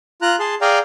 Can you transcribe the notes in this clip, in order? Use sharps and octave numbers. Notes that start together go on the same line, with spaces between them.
F4 A#5 F#6
G#4 A5 C6
G#4 D5 F5 G5 G#5 A#5